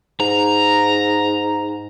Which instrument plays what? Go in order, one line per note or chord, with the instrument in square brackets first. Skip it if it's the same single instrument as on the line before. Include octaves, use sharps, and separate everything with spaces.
[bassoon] G#2 [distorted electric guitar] A#5